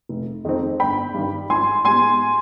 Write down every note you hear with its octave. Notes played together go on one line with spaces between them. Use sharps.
F1
F2 D#3 G#3 C4
G1 G5 B5
G2 D#3
G#1 G#5 C6
G#2 G3 B3 G#5 C6